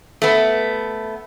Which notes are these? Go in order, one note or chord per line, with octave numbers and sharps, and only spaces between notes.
A3 B3